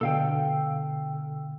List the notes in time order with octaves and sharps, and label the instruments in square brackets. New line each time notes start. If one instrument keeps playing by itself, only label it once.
[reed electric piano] B2 D3 [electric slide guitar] A4 F5 G5